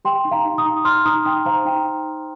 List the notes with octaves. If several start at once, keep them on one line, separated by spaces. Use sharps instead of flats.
G4 G5 C6
D#4
F5 A#5
D#4
A#5 D#6
D#4
D#4 C6 F6
D#4 A#5 D#6
D#4 G5 C6
C5 F5 A#5
D#4 G5